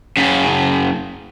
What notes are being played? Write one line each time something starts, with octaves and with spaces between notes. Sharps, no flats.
F#2 C#3